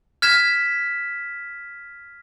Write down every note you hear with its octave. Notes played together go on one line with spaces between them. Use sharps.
F6 G#6 B6 E7